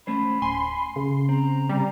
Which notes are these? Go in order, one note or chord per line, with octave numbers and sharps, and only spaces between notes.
A3 C#4 C5 B5
D1 G#5 C6
C#3
C4 A#5
C3 G3